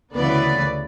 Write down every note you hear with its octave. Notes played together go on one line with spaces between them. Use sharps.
D2 C#3 E3 B3 B4 D5